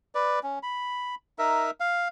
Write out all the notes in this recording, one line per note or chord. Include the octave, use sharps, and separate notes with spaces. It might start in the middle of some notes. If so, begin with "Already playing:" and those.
B4 D5
C#4
B5
D#4 A#4 E5
F5